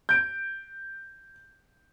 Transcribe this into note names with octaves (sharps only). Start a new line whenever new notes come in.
G6 D7